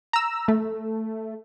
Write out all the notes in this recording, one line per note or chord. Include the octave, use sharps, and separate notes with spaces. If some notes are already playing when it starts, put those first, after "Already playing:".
A#5 E6
A3